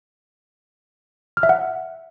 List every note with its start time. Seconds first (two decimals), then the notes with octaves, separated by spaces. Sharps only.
1.37 F6
1.43 E5
1.49 F#5